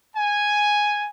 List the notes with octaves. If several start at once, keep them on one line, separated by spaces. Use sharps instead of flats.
G#5